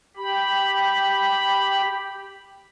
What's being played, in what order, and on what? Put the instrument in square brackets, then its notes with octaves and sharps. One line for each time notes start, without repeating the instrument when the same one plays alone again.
[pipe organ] G4 B5